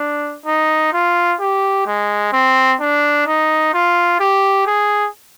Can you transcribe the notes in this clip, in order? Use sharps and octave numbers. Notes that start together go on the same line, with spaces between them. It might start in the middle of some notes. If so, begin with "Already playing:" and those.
Already playing: D4
D#4
F4
G4
G#3
C4
D4
D#4
F4
G4
G#4